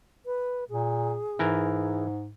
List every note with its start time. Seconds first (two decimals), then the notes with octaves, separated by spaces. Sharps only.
0.26 B4
0.70 A#2 G#4
1.39 G#2 E3 A#4